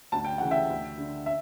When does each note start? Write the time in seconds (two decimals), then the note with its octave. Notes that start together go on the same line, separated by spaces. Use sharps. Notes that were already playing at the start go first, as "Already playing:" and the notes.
0.12 D2 A5
0.25 G5
0.38 C#3 E3 F#5
0.51 E5 G5
0.70 D2
0.98 D3
1.26 E5